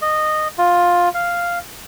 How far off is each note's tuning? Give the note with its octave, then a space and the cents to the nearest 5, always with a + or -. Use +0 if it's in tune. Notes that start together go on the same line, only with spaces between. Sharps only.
D#5 -15
F4 +10
F5 -5